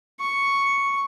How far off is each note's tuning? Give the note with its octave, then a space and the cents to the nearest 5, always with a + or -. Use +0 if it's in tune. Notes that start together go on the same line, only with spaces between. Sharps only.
C#6 +0